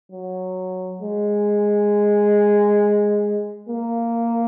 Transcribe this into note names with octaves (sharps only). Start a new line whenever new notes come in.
F#3
G#3
A#3